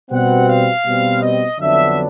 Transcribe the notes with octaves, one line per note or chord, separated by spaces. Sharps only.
B2 G3 C4 F#5
F5
B2 G3 C4
D#5
F2 D3 F#3 B3 D4 E5